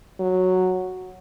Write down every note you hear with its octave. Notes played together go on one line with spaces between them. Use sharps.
F#3